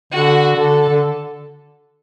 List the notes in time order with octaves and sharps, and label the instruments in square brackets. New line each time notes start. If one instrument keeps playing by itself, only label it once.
[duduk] D3 [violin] F#4
[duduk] D3 [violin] A4
[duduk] D3